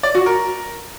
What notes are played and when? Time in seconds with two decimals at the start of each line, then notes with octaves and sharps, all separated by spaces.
0.03 D5
0.15 F#4
0.26 A#4